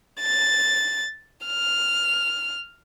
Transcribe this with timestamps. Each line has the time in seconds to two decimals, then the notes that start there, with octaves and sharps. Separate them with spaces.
0.20 A6
1.46 F6